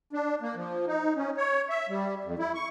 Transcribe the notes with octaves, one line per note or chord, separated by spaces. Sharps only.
D4
A#3
F3
D#4
C#4
C#5
E5
G3
F2
E4
C#6